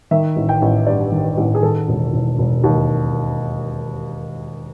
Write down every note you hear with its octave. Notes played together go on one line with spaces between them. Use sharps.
D#3 E5
A1
G5
A1
G2 D5
D#3
A1
G#4
D#3 A4
E1
E1
E1
D#2